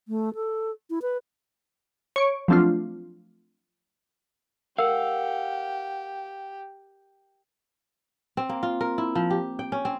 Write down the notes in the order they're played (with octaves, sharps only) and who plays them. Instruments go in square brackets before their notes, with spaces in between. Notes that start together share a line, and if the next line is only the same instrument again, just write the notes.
[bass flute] A3
A4
E4
B4
[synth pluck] C#5 C#6 D7
F3 F#3 A3 C4 D4 F4
[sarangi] G4 [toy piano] A#4 E6 [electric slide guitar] F5 F#5
[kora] C4
A#3
F4
A#4
E4
F3
G4
G5
C#4
C4